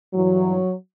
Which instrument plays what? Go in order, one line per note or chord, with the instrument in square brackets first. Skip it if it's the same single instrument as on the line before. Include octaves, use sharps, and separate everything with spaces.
[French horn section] G2 E3 F#3